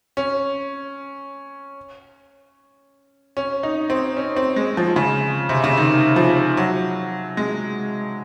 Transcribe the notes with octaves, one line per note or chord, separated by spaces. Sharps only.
C#4
C#4
D#4
C4
C#4
C4
G#3
F3
C#3
C3
C#3
D#3
F3
F#3
G#3